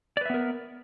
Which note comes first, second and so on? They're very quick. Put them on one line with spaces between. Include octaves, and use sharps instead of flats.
D5 B4 E5 B3 A#4